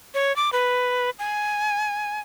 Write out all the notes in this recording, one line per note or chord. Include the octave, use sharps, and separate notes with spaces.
C#5
D6
B4
G#5